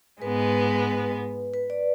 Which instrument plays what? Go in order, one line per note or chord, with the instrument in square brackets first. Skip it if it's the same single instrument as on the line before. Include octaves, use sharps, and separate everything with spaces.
[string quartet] G#2 G#3 B3 [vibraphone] B4
[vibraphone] B4
D5